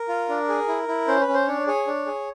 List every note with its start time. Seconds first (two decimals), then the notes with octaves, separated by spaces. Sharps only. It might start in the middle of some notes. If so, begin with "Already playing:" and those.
Already playing: A#4
0.09 F4
0.29 D4
0.49 G#4
0.68 E4
0.88 E4
1.08 C#4 C5
1.21 B4
1.28 C#4
1.34 C5
1.47 D4 C#5
1.67 G#4 C#5
1.87 D4
2.06 G#4